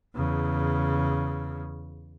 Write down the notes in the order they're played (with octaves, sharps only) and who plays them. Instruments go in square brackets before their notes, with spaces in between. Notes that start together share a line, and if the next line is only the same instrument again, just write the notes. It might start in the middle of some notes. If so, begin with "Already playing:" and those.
[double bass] E2 C#3